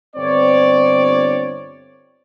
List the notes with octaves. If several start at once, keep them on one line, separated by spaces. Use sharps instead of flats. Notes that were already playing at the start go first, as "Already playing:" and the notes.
G1 C4 C#5 D5